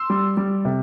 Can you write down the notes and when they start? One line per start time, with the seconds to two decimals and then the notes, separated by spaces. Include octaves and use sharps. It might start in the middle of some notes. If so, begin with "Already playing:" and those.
Already playing: C6 E6
0.10 G3
0.37 G3
0.65 C3